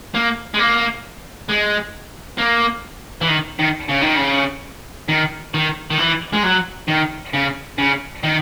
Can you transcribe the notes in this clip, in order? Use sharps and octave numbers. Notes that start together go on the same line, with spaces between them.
A#3
G#3
A#3
G#3
A#3
E3
D#3
D#3
C#3
D#3
C#3
D#3
D#3
D#3
E3
G#3
F#3
D#3
C#3
C#3
D#3